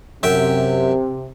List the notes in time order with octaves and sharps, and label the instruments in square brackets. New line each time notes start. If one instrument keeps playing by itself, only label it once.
[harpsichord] F#2 E5 G5 [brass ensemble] C3